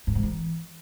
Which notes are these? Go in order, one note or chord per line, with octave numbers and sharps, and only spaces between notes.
G2
G#2
E3